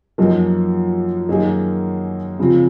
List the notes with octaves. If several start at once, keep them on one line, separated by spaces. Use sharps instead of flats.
F#2 F3 A#3 D#4
F#2 D#3 A#3 D#4 G#4
C#3 F3 C4 F4